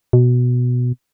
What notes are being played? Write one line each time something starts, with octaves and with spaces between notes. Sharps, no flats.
B2